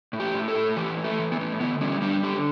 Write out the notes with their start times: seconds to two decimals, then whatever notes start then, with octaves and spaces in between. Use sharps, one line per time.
0.13 A2
0.20 G4
0.35 A2
0.48 A4
0.55 A2
0.76 E3 G4
0.97 A2
1.04 A3
1.19 E3
1.32 B3
1.40 A2
1.61 D3 B3
1.81 G3 C#4
2.02 G3 D4
2.24 D3 G4